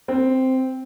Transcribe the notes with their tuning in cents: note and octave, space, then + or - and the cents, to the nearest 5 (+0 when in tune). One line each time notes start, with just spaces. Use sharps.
C4 -5